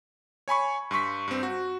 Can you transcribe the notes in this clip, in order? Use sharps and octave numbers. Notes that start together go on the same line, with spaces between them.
C#5 G#5 B5 C#6
G2 C6 C#6 B6
G2 C4
F#4